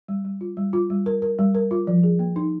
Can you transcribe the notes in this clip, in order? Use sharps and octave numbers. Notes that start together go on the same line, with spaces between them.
G3
G3
F4
G3
F4
G3
A#4
A#4
G3
A#4
F4
F3
G#4
A#3
D#4